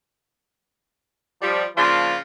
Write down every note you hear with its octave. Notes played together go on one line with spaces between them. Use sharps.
F3 G3
C#3 F3 A#3 D4 F4